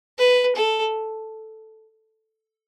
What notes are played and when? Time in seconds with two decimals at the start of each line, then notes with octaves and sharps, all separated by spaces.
0.18 B4
0.55 A4